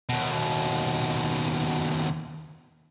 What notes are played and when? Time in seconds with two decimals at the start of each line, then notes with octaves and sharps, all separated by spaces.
0.09 D#2 B2